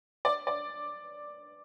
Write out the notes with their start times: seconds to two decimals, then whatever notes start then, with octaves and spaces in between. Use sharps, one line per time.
0.25 D5
0.47 D5